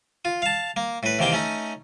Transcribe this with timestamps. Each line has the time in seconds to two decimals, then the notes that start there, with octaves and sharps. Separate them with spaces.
0.25 F4
0.42 F5 A5
0.76 A#3
1.03 A2 B4
1.19 E2 C3 D#3 A#3 G5
1.32 A3 C#4 D#4